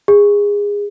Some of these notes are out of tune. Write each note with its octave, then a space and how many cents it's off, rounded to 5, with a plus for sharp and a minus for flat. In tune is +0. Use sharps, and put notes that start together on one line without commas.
G#4 -25